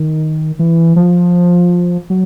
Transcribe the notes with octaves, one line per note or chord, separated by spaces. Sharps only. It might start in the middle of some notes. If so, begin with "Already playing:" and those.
Already playing: D#3
E3
F3
F#3